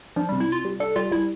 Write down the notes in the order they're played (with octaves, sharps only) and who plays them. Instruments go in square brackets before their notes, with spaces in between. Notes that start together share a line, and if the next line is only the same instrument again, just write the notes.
[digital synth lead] F3 [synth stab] D4
[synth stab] C3 [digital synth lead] G3
[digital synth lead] E4
[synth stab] C3 [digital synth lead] F4
[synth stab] G3
[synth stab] D4 [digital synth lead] A4
[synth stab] G3 [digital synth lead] F4
[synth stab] G3 [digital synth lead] E4